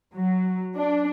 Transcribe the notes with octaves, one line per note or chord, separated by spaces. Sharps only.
F#3
D4